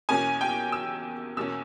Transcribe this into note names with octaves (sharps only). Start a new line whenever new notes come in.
E2 B2 A#3 C#4 G#5
G5
E6
E2 B2 A#3 C#4 E6